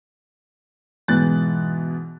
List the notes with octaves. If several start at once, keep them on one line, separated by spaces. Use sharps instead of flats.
G#2 B2 E3 F#6 A6